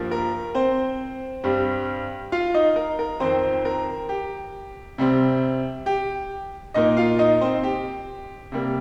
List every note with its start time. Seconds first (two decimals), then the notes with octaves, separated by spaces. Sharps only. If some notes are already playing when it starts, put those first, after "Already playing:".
Already playing: G2 F3 A#3
0.11 A#4
0.55 C4 C5
1.44 G2 G3 C4
2.32 F4 F5
2.54 D#4 D#5
2.76 A#4
2.99 A#4
3.20 F2 D#3 C4 C5
3.65 A#4
4.09 G4
4.98 C3 G3 C4
5.86 G4
6.74 A#2 A#3 D#4 D#5
6.97 F4 F5
7.19 D#4 D#5
7.41 C4 C5
7.63 G4
8.52 C3 G3 A#3